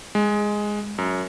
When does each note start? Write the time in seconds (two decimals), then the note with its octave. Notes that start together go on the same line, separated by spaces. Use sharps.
0.15 G#3
0.98 F#2